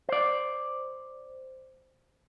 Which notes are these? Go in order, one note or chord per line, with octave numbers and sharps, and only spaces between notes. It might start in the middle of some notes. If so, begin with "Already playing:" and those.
C5 D5